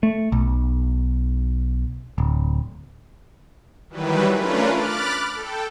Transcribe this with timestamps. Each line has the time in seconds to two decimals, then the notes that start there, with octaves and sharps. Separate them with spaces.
0.03 A3
0.32 B1
2.18 D1
3.89 D#3 E3 F#3 G3 B4
4.35 A3 C#4 D4 F4 A#4 B4
4.69 B5 D6 F6 F#6 A6
5.34 A4 G5